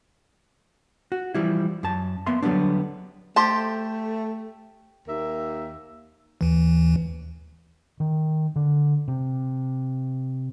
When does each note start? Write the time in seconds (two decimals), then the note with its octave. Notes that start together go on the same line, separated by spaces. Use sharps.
1.12 F#4
1.34 E3 F3 G3 E4
1.83 F#2 A5
2.27 A#3 B3 E5 C6
2.43 D3 F#3 G3 B3 C4 D4
3.36 A3 G4 C5 A5
5.07 D#2 A#3 E5
6.41 D#2 E3
8.00 D#3
8.56 D3
9.08 C3